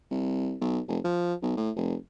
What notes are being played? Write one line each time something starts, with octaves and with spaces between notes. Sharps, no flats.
C2
B1
F1
F3
B1
A2
F1